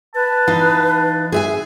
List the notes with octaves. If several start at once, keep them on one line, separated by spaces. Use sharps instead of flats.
B4 A5
E3 D#4 F5
G#4 E5 G#5